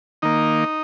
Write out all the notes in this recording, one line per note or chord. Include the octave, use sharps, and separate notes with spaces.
D#3 A#3 D#4